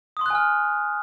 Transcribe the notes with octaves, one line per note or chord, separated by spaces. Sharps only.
G#5 C6 D#6 F6 F#6